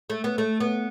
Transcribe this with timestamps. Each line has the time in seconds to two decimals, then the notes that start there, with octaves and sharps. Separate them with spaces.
0.10 A3
0.24 B3
0.38 A3
0.61 B3